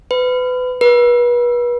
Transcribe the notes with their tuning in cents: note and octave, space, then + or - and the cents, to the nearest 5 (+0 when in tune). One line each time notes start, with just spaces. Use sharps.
B4 +30
B4 -35